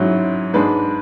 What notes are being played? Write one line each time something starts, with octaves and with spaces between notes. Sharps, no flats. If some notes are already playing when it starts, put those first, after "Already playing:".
Already playing: G#2 F#3 C#4 E4
G#2 G#3 D4 B4